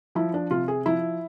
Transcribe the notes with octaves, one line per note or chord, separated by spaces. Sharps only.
F3 E4
D4
C3 F4
G#4
F3 E4